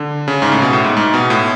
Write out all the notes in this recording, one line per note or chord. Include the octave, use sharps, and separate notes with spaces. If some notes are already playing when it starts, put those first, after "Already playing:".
Already playing: D3
C#3
G#2
A2
B2
A2
G#2
G#2
B2
A2